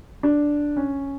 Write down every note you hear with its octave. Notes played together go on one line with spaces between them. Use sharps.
D4
C#4